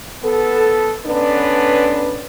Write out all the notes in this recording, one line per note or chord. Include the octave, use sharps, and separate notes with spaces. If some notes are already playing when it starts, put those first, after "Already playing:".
B3 A4
D3 B3 C#4 D4 B4